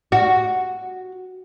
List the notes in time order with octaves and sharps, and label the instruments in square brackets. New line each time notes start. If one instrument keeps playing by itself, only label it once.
[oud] F#4